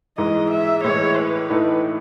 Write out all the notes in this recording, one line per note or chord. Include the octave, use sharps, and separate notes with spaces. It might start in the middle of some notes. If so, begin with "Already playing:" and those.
G#2 E3 G#3 D#5
E5
A2 E3 G#3 C#5
B4
A2 E3 A3 D#4